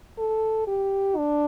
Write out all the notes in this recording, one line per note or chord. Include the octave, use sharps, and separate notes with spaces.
A4
G4
D4